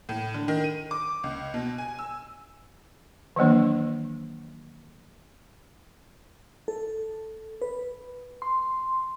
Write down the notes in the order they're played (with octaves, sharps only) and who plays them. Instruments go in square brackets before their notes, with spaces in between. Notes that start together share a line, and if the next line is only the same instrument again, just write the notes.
[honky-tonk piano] A2
D3
D#3
D#7
D6
C#2
B2
G#5
E6
[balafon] D#3 E3 F#3 A#3 D4
[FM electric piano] A4
B4
C6